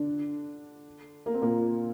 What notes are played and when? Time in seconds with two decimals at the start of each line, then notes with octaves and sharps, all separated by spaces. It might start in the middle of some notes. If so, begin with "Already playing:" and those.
Already playing: D3 D4
1.26 A#3
1.34 C4
1.42 A#2 A#3